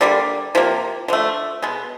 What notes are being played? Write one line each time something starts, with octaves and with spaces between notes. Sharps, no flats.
D3 G3 A#3 D5
C3 F3 A#3
D3 F3 A3
B2 G#3 B3